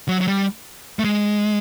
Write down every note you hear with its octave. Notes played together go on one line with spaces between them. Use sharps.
F#3
F#3
G3
A3
G#3